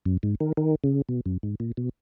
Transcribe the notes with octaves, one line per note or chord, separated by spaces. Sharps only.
F#2
G#2
D#3
D#3
C#3
B2
F#2
G#2
A#2
B2